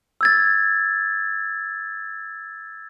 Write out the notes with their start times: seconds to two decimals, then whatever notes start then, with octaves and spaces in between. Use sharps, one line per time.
0.21 E6 G#6 A6